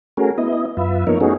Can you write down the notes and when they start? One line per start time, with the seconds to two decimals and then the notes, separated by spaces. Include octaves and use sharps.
0.17 A3 C#4 F#4 G#4 A#4
0.38 B3 E4 D#5
0.77 F#2 F4 B4 E5
1.07 F3 A#3 B3 D#4 A#4 C#5
1.21 A3 B3 C#4 D#4 F#4 G#4